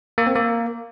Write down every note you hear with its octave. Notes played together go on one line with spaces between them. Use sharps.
A#3
C4
A#3